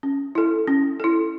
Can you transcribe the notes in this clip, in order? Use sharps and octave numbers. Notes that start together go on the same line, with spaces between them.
C#4
E4 A4
C#4
E4 A4